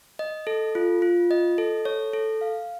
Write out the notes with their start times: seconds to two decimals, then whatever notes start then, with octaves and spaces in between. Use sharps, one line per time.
0.19 D#5
0.47 A4
0.75 F4
1.02 F4
1.31 D#5
1.58 A4
1.85 C#5
2.14 A4
2.41 F5